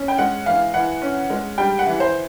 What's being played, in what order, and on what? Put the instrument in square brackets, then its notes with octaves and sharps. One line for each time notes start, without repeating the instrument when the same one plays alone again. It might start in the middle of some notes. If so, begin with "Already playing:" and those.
Already playing: [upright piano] C#4
G5
G#3 F#5
E3 F5
E3 F#5
C#4
G#3
G3 G5
F#5
E3
C5